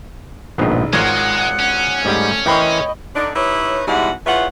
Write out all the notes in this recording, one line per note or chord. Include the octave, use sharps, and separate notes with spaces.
E1 A#1 G#2 D#3 B3
G#1 G#3 F4 A#4 C#5 F#5 G#6
C#4
G#2 G3 A3 G4
E3 A#4 C5 D#5 G5 B5 C#6
D3 D4 D#4
D#4 E4 G4 B4 C#5
G#2 B2 G3 G#3 E4 F#5
E2 F4 B4 C#5 E5 F#5